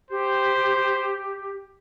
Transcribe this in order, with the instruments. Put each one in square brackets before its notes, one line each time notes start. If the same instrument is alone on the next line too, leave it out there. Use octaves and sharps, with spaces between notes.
[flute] G4 [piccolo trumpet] C5